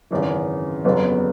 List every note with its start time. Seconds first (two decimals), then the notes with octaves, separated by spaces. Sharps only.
0.11 G#1 F#2 C#3 E3
0.84 G1 F2 C#3 F#3 B3